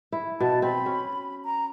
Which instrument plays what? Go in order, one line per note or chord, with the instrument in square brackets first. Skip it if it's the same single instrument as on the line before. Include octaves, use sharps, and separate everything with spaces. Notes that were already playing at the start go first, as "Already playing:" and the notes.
[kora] E4
[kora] B2 [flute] A5
[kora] C4 [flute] B5
[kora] C#4
[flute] A#5